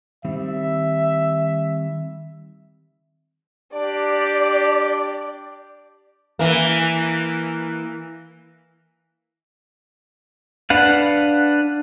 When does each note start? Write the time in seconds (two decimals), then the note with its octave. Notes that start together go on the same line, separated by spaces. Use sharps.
0.25 D#3 G3 C4 E5
3.73 D4 G4 D5
6.39 E3 A#3
10.70 D4 B4 F5 F#5